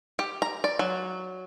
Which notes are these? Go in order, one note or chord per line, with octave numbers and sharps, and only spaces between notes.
G4
A#5
D5
F#3